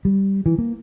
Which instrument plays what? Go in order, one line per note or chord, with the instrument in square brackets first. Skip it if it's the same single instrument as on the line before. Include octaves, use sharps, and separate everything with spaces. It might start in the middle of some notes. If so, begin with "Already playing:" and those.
[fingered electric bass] G3
E3
A#3